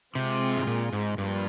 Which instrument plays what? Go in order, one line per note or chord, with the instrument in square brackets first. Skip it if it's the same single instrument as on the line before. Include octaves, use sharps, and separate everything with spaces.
[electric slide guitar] C3 [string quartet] G#3 C4 F4 G#4
[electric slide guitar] G#2
A#2
G#2
[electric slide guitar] G2 [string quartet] F3 A#3 F4